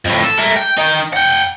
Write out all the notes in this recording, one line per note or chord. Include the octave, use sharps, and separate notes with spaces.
F2 A2
A4
A3 A#4
G5
D#4 G5
F#5 G5